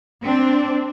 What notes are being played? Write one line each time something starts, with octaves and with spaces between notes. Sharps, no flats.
C4 D4